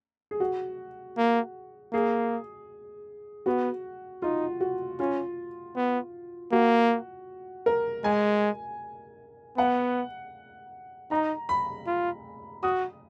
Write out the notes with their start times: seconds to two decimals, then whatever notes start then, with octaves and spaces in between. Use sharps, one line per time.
0.31 G#4
0.40 F#4
1.17 A#3
1.93 A#3 G#4
3.46 B3 F#4
4.22 D#4 F4
4.60 F#4
5.00 C#4 F4
5.76 B3
6.52 A#3 F#4
7.66 A#4
8.04 G#3 G#5
9.57 B3 F#5
11.11 D#4 A#5
11.49 B5
11.87 F4
12.63 F#4 D#6